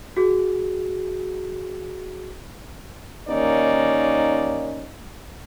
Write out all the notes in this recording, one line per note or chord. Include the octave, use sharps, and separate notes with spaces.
F#4 G#4
D#2 A#3 C#4 D#4 D5